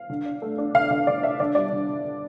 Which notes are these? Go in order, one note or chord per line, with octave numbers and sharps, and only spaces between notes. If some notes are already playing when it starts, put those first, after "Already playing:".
Already playing: F5
D3
D4
A3
D4
D3 F5
D3 F5
D3 D5
D4 E5
D3 D5
G3 D5
D3
D3
D3